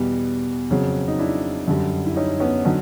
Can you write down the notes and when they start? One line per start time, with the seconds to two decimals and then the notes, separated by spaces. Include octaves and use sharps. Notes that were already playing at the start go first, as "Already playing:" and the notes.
Already playing: E2 B2 G3
0.70 F2 C#3 F#3
1.08 D#4
1.19 D4 E4
1.68 F#2 D3 G3
2.06 E4
2.16 C#4 D#4
2.40 B3 C#4
2.65 D3 F#3 C#4 D#4